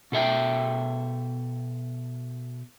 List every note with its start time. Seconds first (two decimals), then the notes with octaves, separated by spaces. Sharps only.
0.12 B2 A4 E5 G5